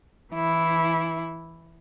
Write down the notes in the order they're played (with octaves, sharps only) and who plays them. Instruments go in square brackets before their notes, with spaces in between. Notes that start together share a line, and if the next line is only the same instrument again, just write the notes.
[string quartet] E3 E4